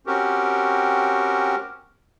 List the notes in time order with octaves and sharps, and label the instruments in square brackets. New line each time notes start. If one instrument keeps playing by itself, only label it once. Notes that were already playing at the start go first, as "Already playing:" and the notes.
[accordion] C4 C#4 F#4 G4 A#4